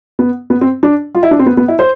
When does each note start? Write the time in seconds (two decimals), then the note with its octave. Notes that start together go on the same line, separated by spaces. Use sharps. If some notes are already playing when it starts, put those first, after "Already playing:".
0.19 B3
0.50 B3
0.61 C4
0.83 D4
1.15 F4
1.23 E4
1.31 D4
1.39 C4
1.46 B3
1.57 B3
1.68 E4
1.79 C5